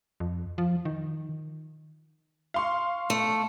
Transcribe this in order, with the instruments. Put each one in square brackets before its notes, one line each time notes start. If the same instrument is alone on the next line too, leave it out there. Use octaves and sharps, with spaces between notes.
[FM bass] F2
F3
D#3
[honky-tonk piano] F5 C6 C#6
[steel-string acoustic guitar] A3